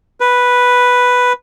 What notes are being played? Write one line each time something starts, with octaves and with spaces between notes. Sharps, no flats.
B4